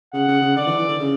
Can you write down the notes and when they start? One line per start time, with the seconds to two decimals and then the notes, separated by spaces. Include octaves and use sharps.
0.13 C#3 F#5
0.28 C#3
0.42 C#3
0.56 D3 D5
0.67 E3
0.78 E3
0.88 D3
1.00 C#3